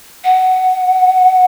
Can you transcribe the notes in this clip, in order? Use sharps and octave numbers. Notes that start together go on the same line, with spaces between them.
F#5